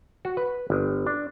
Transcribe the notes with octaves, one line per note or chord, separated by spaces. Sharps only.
F#4
B4
G1
D4